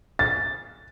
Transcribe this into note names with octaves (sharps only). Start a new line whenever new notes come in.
A6